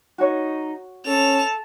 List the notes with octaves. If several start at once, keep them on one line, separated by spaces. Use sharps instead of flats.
D#4 F#4 C#5
C#4 A4 A5 F7